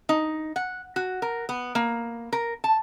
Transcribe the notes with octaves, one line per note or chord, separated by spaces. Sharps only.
D#4
F#5
F#4
A#4
B3
A#3
A#4
A5